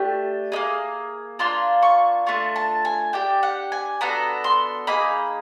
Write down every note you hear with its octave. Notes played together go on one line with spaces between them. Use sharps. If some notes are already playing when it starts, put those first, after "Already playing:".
Already playing: A3 D4 G4
A#3 D#4 G#4
A#3 D4 F4 C6
C#6
A3 D4 F4 C#6
A5
G#5
D4 G4 G5
F#5
G#5
B3 D4 F#4 A4 A#5
C6
A#3 D#4 G#4 B5